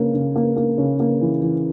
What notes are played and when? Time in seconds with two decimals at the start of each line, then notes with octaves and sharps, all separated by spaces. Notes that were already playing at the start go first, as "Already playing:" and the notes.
Already playing: C#3 A#3
0.14 C#3
0.36 A#3
0.57 A#3
0.78 C#3
1.00 A#3
1.21 E3
1.42 E3